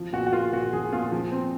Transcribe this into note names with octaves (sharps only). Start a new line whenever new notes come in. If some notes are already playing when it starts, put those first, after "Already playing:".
Already playing: F3
A#2 F#4
F#4
A#3 F4
A#2 F#4
F3 G#4
A#2 F4
F3
C4